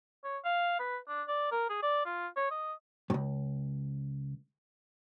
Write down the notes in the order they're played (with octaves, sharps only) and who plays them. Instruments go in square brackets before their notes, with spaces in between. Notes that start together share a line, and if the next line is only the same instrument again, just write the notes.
[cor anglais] C#5
F5
B4
D4
D5
A#4
G#4
D5
F4
C#5
D#5
[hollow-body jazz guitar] C#2 G2